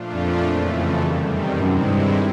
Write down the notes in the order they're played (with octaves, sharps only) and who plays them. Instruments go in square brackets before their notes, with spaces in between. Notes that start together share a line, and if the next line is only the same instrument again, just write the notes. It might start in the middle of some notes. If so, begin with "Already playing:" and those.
Already playing: [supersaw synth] A#2 F3 A3 D4 F4
[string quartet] F2
[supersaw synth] F#2 C#3 E3 A3
E2 C3 D#3 G3
[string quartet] F#2 [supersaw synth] C3 D#3 G#3 C4 E4
[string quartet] G2